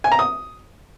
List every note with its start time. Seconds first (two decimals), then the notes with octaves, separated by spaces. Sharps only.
0.04 G#5
0.12 A#5
0.19 D#6